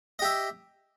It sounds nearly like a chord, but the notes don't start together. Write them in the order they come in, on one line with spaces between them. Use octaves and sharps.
D#5 G4 E5